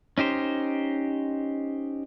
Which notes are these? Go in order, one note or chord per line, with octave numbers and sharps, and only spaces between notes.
C#4 D#4 G4 C5